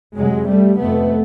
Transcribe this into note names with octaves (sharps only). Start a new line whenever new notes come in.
F2 C3 F#3 G#3
G3 A3
F2 C3 A3 B3